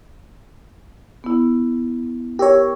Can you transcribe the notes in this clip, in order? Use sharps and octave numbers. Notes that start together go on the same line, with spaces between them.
B3 E4
G4 A#4 C#5 E6